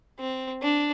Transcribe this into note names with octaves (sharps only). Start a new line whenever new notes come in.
C4
D4